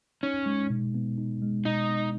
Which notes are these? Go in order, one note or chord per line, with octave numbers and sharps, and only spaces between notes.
C#4 D#4
G#3
B2
B3
D#4
G#3
B2 D#4
B3